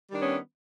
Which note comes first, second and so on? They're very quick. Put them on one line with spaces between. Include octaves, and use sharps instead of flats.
G3 D#3 D4 B3 C#4